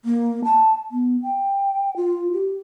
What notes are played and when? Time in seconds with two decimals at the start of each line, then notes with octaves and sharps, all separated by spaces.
0.05 A#3
0.44 A5
0.92 B3
1.23 G5
1.96 F4
2.33 G4